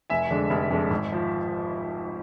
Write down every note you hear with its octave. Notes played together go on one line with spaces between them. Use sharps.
F1 E5 G#5
F2 D3 G#3
F1
F2 D3 G#3
G#1
F3